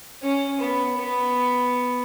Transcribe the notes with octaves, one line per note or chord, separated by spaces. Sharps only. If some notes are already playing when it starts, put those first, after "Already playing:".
C#4
B3
B3